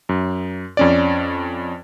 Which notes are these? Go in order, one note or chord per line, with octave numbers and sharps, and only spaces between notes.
F#2
F2 C#4 D5